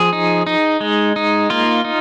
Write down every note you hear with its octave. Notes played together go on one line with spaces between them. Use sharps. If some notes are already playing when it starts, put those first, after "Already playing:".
Already playing: F3 G#4
D#4
D#4
G#3
D#4
A#3 F4
D#4